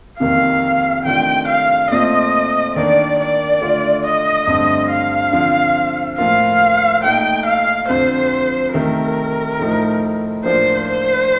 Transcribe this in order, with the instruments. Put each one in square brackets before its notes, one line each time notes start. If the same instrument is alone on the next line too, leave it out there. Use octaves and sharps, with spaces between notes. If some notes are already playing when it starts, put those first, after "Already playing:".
[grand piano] F2 C3 D#3 A#3 [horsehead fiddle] F5
[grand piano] C3 D#3 A3 D4 F4 [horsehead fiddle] G5
[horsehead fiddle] F5
[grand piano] A#2 A3 C4 F4 [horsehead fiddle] D#5
[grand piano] D#3 A#3 D4 [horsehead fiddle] D5
[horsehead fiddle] D5
[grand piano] D3 A3 D4 F4
[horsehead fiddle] D#5
[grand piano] G2 D3 A3 C4
[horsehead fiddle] F5
[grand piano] D3 F3 C4
[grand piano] A2 F3 A#3 F4 [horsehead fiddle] F5
[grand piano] A#2 A3 D#4 [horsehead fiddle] G5
[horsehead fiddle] F5
[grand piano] F2 D3 F3 C4 F4 [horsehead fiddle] C5
[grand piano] C3 D#3 A3 [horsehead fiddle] A#4
[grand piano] A2 F3 A3 D#4
[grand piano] A2 F3 A#3 D4 F4 [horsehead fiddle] C5
[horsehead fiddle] C5